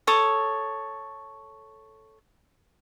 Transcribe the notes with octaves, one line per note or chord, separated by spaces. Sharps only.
A4 C#5 D#6